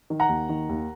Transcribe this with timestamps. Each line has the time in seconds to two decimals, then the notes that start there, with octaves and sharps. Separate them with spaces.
0.10 D#3
0.20 F#5 A#5
0.29 D#2
0.49 D#3
0.69 D#2